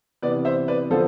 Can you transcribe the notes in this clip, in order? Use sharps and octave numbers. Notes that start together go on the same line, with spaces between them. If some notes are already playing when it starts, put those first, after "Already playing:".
C3 E3 B3 B4 D5
C5 E5
B4 D5
D3 F3 B3 A4 C5